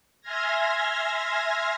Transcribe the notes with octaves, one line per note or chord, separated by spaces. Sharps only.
E5 G#5 C6 F6 G#6 A#6